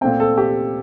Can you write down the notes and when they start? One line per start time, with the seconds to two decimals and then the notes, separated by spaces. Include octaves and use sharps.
0.01 A#2 A3 C4 G5
0.20 A4
0.38 G4